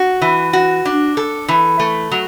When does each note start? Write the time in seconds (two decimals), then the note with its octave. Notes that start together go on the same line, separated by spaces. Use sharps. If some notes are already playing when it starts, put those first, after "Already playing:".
Already playing: F#4
0.22 E3
0.53 F#4
0.85 D4
1.17 A4
1.48 E3
1.79 A3
2.12 F#3